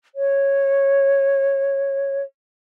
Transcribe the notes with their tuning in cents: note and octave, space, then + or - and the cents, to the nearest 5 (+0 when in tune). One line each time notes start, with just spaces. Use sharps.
C#5 -10